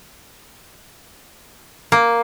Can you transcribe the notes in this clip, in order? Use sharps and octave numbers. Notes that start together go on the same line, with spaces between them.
A#3